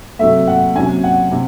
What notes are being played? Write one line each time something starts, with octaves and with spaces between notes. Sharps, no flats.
C3 F#3 A3 E5
F#5
C3 F#3 C#4 G#5
F#5
C3